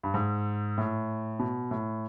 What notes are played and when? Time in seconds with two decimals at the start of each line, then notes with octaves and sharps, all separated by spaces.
0.03 G2
0.14 G#2
0.78 A2
1.39 B2
1.71 A2